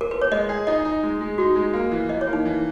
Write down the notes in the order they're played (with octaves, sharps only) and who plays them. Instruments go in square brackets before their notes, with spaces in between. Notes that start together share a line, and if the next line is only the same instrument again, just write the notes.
[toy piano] A#4
B4
C#5
[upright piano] G#3 [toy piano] D#5
[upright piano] G#4
[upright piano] D#4 [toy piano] D#5
[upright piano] D#4
G#3
G#3
[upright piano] D#4 [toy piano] F#4
[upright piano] G#3
A#3
E3
[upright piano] E3 [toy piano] D#5
[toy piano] C#5
[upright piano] A#3
[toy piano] D#4
[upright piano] E3